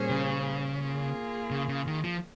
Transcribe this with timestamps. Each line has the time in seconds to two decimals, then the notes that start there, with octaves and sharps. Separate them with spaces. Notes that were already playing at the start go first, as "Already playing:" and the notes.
Already playing: A#2 G3 C#4 G#4 C5
0.10 C#3
0.81 A#3 F4 G#4
1.51 C#3
1.68 C#3
1.87 D#3
2.04 F3